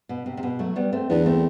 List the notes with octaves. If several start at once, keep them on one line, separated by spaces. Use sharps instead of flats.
B2
C3
C3
B2
F#3 A3
G3 B3
A3 C4
E2 B3 D4
A3 C4